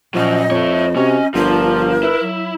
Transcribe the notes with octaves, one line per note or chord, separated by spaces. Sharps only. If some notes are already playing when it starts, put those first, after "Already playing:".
A#2 F3 F#3 C#4 D#5
F2 A4 C#5
C3 C#4 F#4
G1 F3 D4 A#4
E4 B4
F#3